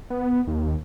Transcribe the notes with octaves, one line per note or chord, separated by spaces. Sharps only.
B3
D#2